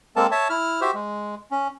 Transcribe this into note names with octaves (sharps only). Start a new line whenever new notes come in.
G#3 A#3 C4 A4 A#4 A5
C#5 E5 A5
E4 F6
F#4 G4 C5 E5
G#3
C#4